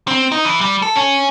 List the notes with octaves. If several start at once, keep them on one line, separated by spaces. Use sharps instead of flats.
C4
D#4
E3
G3
A4
C#4